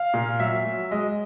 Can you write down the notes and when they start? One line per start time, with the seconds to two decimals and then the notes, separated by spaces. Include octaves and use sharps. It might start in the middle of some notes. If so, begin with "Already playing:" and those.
Already playing: F5
0.14 A#2
0.40 F#3 E5
0.65 F#3
0.91 G#3 D#5